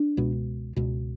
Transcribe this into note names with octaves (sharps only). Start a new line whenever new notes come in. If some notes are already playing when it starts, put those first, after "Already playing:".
Already playing: D4
C#2 B2
C#2 B2